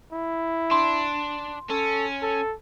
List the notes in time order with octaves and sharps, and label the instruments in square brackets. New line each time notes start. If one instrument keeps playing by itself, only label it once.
[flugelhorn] E4
[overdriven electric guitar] D4 [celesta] C6
[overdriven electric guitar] C#4 [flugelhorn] A4
[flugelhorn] A4